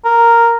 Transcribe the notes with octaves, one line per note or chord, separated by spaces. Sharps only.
A#4